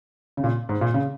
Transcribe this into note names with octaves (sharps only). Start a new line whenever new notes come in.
C#3
A#2
G#2
A#2
C#3